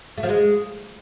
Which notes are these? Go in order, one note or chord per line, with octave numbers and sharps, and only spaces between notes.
A3
F3
G#3